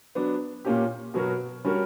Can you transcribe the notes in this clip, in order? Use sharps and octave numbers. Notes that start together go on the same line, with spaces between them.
F#3 B3 D4
A#2 A#3 C#4 G4
B2 F#3 B3 F#4 A#4
G3 C#4 F#4 A#4